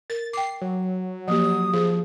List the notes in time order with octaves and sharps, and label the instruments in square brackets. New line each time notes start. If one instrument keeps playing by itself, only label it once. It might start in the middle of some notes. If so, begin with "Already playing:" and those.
[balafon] A#4 [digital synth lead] A6
[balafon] G5 D6 [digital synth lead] C7
[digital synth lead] F#3
[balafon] F3 A#3 G4 [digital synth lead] F#3 [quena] D#6
[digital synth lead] F3 [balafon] G#4